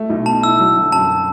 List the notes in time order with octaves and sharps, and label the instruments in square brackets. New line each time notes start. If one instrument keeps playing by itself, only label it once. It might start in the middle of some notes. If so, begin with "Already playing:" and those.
Already playing: [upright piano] A3
B1
[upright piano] B2 [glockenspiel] A5
[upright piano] E4 [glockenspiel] E6
[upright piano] F#3
G1
[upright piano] F#2 [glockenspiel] A5